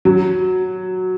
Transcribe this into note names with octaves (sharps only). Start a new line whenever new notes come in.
F#3